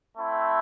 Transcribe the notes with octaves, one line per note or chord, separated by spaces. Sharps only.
A3 C4 E4